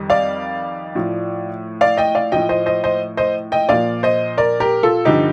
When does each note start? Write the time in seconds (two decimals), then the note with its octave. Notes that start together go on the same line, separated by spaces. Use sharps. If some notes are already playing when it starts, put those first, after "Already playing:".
Already playing: F2 D#3 G3
0.10 D5 F5
0.95 A2 F3
1.81 D5 F5
1.97 D#5 G5
2.15 D5 F5
2.32 A2 F3 D#5 G5
2.49 C5 D#5
2.66 C5 D#5
2.84 C5 D#5
3.17 C5 D#5
3.52 D#5 G5
3.69 A#2 F3 D5 F5
4.03 C5 D#5
4.38 A#4 D5
4.60 G4 A#4
4.83 F4 A4
5.05 G2 D3 F3 D#4 G4